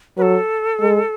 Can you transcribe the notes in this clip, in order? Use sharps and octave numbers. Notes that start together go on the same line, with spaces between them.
F#3 A4 B4
G#3